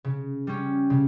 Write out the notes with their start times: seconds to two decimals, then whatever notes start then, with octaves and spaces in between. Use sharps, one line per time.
0.04 C#3
0.47 G3 C#4
0.90 C#3